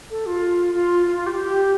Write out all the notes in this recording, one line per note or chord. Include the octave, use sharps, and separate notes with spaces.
A4
F4
F4
F4
F4
G4
G4